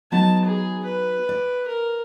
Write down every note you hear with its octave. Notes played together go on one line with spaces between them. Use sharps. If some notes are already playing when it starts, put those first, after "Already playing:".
F#3 B3 D#4 A5
G#4
B4
D5
A#4